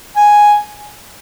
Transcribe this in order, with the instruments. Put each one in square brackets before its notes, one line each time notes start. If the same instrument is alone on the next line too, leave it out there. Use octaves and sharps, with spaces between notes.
[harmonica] G#5